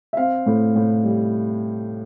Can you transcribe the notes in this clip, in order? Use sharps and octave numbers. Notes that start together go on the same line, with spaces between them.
E5
C4 F5
A2
A2
G3